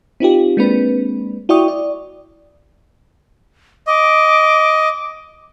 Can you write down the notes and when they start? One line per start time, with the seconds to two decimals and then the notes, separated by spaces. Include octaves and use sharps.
0.20 C4 D#4 F4 G4
0.57 G#3 A#3 C4 D4 B4
1.49 E4 F#4 D5 G5 C#6 D#6
1.68 D5
3.87 D#5 D6